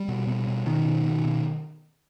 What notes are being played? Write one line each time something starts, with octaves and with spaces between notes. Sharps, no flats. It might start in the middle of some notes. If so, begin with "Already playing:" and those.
Already playing: G3
B2
B2
B2
B2 D#3
B2
B2
B2